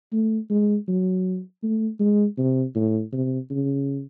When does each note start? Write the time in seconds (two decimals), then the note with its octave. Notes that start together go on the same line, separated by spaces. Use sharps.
0.13 A3
0.50 G#3
0.88 F#3
1.63 A3
1.99 G#3
2.38 C3
2.76 A2
3.12 C3
3.50 C#3